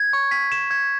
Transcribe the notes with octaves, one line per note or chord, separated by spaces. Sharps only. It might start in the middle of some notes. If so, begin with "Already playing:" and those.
Already playing: G#6
C#6
B6
E7
G#6